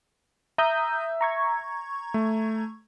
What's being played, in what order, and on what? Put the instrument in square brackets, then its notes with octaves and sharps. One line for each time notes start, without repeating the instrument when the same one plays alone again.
[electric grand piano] E5 [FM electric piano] A#5 D#6 G6
[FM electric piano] A#5 C#6 G#6
[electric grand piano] A3